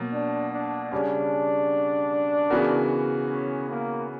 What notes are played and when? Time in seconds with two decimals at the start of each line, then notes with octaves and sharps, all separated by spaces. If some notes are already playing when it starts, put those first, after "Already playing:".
Already playing: B2 F#3 A#3
0.12 D4
0.53 D4
0.92 C#3 G3 C#4 D4
2.50 C#3 E3 B3 F#4 A#4
3.29 C#4
3.69 A#3